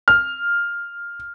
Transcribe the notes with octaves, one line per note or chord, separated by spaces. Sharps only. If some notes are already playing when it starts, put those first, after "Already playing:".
F6